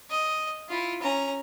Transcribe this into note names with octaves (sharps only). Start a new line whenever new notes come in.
D#5
E4 F4
C#4 A#5